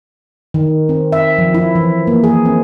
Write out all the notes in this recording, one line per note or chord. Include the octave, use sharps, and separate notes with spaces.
D#3
C4
E5
F3
E4
E3
A#3
G#4
C4